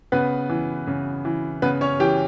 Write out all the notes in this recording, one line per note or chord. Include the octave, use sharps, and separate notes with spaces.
C#3 B3 B4
E3
C#3
E3
C#3 B3 B4
C#4 C#5
E3 G4 G5